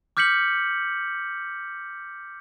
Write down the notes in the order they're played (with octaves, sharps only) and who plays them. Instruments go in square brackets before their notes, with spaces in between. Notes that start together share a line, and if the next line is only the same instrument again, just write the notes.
[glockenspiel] D6 F6 G6 B6 C#7 F#7